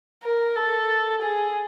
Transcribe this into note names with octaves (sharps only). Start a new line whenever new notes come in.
A#4
A4
G#4